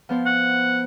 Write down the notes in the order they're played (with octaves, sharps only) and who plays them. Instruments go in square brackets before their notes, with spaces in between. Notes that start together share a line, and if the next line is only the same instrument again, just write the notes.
[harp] F3 B3 C5
[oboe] F#5